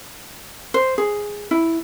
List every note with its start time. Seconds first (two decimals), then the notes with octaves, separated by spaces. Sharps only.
0.74 C5
0.98 G#4
1.51 E4